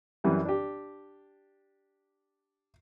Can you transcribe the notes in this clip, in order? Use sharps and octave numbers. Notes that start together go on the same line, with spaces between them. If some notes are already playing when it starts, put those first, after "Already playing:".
F#2 E3 G3
D4 G4